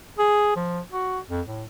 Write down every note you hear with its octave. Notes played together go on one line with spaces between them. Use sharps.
G#4
F3
F#4
F2
A2